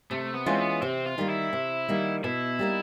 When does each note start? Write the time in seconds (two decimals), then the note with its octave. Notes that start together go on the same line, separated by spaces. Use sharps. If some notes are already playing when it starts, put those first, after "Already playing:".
0.11 C3 A3
0.34 B3
0.46 E3 G#3 C4 C#4 F4
0.59 B3
0.82 C3 C4
1.06 F4
1.18 D#3 G3 A#3
1.29 E4
1.53 C3
1.89 D#3 G3 A#3
2.24 B2 E4
2.59 G3 A#3 D#4